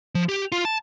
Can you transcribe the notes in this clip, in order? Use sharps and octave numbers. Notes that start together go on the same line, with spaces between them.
F3
G4
F4
A5